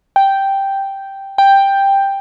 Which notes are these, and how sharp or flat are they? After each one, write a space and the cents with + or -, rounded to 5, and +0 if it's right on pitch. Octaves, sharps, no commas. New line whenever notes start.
G5 -5
G5 +5